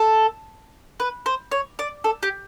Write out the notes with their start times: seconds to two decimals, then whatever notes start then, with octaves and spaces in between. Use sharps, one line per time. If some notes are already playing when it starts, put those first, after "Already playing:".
Already playing: A4
1.00 B4
1.26 C5
1.52 C#5
1.79 D5
2.04 A4
2.23 G4